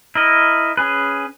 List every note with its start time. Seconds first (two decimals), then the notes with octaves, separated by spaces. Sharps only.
0.15 E4 A#4 D#5
0.77 C#4 G#4 B4